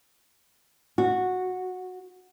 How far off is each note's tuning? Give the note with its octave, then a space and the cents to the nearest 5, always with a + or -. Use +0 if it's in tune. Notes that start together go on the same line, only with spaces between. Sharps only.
F#4 -10